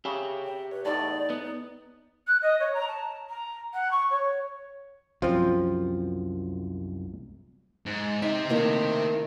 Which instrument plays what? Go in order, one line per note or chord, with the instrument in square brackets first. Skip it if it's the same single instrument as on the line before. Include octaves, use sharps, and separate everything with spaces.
[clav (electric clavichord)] C#3 [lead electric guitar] G4 E5
[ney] G5
[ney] B4 [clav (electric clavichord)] C#5
[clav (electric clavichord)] E2 A2 [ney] D#4 [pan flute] D5
[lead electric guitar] B3
[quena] F#6
D#5
C#5
A#5
A5
A#5
F#5
C#6
C#5
[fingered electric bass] C2 F#2 [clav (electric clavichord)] F3 C4 F4
[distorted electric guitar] G#2
[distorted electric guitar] C4 E5 [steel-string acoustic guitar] D#4
[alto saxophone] D#3 [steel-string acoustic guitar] A3 A#3 E4